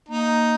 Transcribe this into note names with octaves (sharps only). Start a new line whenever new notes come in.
A#3 D#4